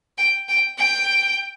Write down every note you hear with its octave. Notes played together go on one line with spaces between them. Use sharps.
G5
G5
G5